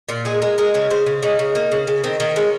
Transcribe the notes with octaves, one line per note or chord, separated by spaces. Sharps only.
A#2 F4
G#3 G#4
G#3 A#4
G#3 A#4
C#3 C#5
C#3 C5
C#3
C#3 D#4
C#3
A#3
C#3
C#3
D#3 C4
D#3 A#3
G#3 C#4